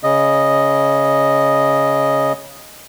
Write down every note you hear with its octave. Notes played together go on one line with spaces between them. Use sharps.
C#3 D#5